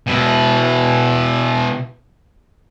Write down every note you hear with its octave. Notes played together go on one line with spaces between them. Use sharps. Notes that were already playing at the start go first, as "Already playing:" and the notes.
B2 E4